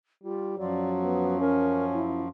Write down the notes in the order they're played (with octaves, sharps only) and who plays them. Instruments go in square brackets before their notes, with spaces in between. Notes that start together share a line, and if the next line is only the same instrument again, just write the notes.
[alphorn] G3 [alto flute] F4
[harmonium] F#2 F3 [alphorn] F#3 [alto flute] D5
[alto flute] B3
[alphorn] C#4 [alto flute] A#4
[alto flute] E4